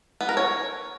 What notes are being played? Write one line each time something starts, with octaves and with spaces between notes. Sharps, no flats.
B3
A#4
C#5